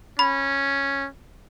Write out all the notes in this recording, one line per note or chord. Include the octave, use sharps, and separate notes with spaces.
C#4 B5